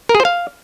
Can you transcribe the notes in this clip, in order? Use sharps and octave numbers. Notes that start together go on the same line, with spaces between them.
A#4
G#4
C5
F5